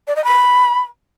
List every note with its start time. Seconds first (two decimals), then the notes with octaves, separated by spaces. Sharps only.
0.07 D5
0.16 D#5
0.24 B5